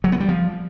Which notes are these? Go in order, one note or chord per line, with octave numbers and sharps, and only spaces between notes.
F#3
B3
G3
F3